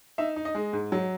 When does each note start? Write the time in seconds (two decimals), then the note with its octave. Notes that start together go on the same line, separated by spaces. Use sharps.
0.18 D#4 E5
0.36 D#4
0.45 D#5
0.55 G#3
0.73 G#2
0.92 F#3